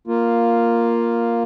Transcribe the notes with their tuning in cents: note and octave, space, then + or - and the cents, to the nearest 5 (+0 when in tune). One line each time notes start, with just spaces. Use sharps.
A#3 +0 F4 +0